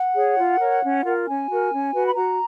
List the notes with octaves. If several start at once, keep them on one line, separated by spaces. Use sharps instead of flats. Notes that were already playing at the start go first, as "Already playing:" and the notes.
Already playing: F#5
G#4 C#5
F4
A#4 C#5
C#4
F4 A#4
C#4 G#5
F#4 A#4
C#4
F#4 B4
B5
F#4 A#5